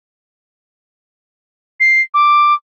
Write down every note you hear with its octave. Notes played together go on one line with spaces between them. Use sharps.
C7
D6